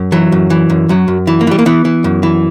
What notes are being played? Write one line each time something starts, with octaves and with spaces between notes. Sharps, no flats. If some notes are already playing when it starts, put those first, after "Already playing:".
Already playing: F#2
E3 F#3
F#2
E3
F#2
F#2 F#3
F#2
E3
A#3
E3 G3
A#3
E3 B3
E3
F#2
E3